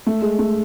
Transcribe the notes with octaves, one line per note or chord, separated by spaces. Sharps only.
A3
G#3
A3